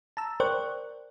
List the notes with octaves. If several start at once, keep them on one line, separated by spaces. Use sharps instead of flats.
A5 A#5 E6
A#4 C5 D5 G5 C#6 F#6